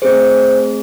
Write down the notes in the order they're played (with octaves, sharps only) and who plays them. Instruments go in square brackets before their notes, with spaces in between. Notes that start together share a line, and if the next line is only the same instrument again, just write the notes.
[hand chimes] A3 C4 G#4 C5